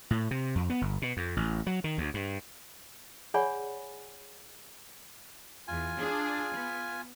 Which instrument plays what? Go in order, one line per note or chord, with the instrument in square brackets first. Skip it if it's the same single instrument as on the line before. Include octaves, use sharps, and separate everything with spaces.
[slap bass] A2
C3
F2
B3
G1
B2
F2
A1
F#3
D#3
D2
G2
[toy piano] G#4 C#5 D5 F#5 G#5 B5
[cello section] E2 [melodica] F4 G#5
[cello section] D4 G#4
B3